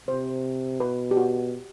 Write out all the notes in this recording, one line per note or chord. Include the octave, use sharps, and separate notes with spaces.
C3 C5
B2 B4
G4
F#4